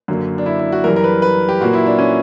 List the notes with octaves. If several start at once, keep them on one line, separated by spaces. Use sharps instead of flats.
F#2 D3 F#3 A#3
D4
E4
E4
F#4
F#2 E3 G3 A#4
A#4
B4
B4
G4
A#2 F#3 A#3 F#4
E4
D4
C#4